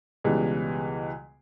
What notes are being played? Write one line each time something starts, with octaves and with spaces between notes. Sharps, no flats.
C#2 B2 E3 G3 G#3